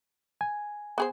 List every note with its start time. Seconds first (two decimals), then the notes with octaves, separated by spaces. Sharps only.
0.41 G#5
0.98 B3 G#4 C5